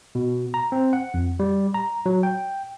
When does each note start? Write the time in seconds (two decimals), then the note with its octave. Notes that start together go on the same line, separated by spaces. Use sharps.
0.15 B2
0.54 A#5
0.72 C4
0.93 F#5
1.14 F2
1.40 G3
1.74 A#5
2.06 F#3
2.23 G5